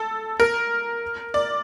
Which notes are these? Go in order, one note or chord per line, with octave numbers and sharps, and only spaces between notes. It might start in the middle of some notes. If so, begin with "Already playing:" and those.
Already playing: A4
A#4
D5